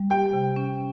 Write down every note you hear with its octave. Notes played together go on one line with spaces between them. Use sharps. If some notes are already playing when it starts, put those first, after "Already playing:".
Already playing: G3
G4 G5
C3
C#4